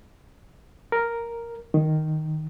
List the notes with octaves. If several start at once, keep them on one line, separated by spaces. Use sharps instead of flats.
A#4
D#3